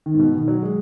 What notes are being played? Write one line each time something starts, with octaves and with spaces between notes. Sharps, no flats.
D#3
G#2
B2
D#3
F#3
G#3